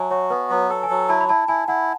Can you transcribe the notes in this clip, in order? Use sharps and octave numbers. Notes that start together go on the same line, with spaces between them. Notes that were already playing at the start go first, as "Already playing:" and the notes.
Already playing: F#3 E5 G#5 A5
F#4 C#5
B3 B4
F#3
A4
G#5
F#3
E4 A5
B5
E4 A5
E4 G#5
E4 F#5